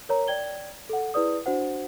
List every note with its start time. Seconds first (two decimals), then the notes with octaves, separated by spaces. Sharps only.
0.09 A#4 C#5 A#5
0.28 D5 G5 G#6 G7
0.89 A4 F#5
1.14 E4 G#4 B4 D5 D#6
1.46 D4 F#4 C5 F#5